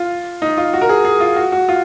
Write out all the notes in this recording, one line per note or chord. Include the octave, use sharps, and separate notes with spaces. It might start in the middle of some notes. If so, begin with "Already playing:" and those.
Already playing: F4
D#4
F4
F#4
A#4
G#4
G#4
F4
F#4
F#4
F4